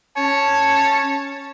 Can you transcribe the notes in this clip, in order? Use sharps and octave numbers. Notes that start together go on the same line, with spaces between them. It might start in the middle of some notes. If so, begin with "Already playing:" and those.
C#4 C#5 A5